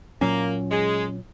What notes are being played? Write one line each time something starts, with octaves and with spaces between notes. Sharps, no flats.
A#2 F#3 A#3 C#4
G#3